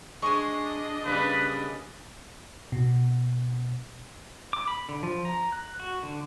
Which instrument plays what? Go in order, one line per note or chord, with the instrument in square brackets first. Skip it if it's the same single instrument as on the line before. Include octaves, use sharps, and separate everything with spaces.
[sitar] G#3 [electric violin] D4 D#5 [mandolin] G#5 C#6
[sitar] C#3 G3 A#3 [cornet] B4
[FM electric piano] B2
[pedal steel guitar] D6
B5
D3
F3
A#5
F#6
F#4
D3